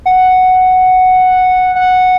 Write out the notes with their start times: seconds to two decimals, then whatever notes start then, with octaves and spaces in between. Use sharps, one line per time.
0.06 F#5
1.75 F#5